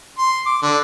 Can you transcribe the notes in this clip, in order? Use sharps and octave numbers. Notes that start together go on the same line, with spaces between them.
C6
D6
D3